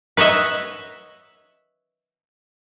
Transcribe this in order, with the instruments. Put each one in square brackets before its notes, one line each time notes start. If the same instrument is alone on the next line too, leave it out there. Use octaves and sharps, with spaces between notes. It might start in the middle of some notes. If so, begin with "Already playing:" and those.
[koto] B4 C#5 D#5 E5 F#5